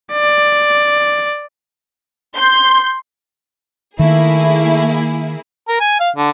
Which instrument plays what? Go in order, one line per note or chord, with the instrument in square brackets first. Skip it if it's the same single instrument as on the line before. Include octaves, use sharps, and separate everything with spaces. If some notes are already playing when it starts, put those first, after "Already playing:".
[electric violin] D5
[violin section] C6 G6
[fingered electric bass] D#3 [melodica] A3 [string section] A#3 E4 G#4
[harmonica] A#4
G#5
F5
D3